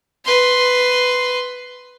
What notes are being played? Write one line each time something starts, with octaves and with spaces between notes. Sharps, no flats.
B4 C6